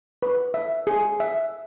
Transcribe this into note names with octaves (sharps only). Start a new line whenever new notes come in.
B4
E5
G#4
E5